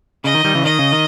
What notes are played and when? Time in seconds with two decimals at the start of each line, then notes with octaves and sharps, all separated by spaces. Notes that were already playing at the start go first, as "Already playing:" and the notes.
0.24 C#3 D#5
0.34 D#3
0.44 D#3 G3
0.55 C#3 E3
0.65 D#3 D#5
0.79 C#3
0.92 D#3